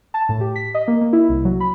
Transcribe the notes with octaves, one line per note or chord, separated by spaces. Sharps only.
A5
A2
G4
B6
D#5
A#3
A#3
E4
C2
F#3
B5